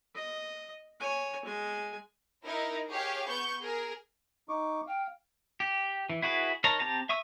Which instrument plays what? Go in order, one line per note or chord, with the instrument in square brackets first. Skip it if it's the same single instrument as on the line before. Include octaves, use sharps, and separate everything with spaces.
[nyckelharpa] D#5
C#5 G#5
G#3 G#5
[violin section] D#4 E4 A#4
G4 G#4 C#5 F5
B3 C#6 G6
G#4 A#4
[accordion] D#4 C#6 D6
[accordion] F5 [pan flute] G5
[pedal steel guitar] G4
E3
E4 F#4 G#4 B4
D#4 A#4 C#5 A5 A#5
C4 G4 A5 A#5
E5 C#6 D#6 E6